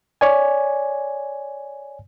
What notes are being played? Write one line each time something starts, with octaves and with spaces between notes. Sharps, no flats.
C#5 D5 G#5